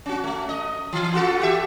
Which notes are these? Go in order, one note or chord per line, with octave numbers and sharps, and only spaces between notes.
C#4 F#4
A3
D#5
E3
F4 F#4 A4
F#4 G4 E5